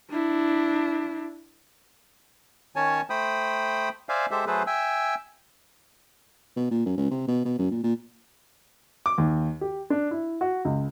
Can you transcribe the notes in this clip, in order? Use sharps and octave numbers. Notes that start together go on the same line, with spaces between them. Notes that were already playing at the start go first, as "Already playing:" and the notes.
D4 E4
D#3 C#4 C#5 G#5 A5
A3 C5 G5 B5 D#6
C5 D5 E5 F5 G#5
G#3 G4 A4 C5 E5
F#3 A3 G#4 A4 B4 C5
E5 G5 G#5 E6
B2
A#2
F#2
C#2
C3
B2
B2
F#2
A#2
A#2
D6
D#2
G4
D4
E4
F#4
C#2